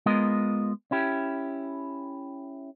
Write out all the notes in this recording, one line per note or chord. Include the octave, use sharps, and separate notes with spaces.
G#3 B3 F4 A#4 D#5
C#4 E4 G4